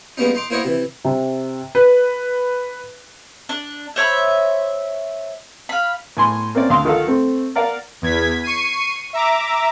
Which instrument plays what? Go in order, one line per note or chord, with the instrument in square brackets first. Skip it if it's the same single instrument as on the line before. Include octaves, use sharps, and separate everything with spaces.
[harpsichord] G3 G#3 A#3 B3 C#4 D#4
D#4 C6 D6
A#3 E4 C5 C#5 D#5 F#5
C3 E3
[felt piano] C3
B4
[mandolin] D4
C5 C#5 E5 B5
F5 B5
[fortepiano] A2 G#5 C6
A#3 C4 C#4 D5
D2 F5 C6
D#3 F4 A4 F5 F#5
A3 C4
A#4 D5 F5 F#5
[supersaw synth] E2 G#6 B6
C#6 C7 D#7
E5 A#5 D6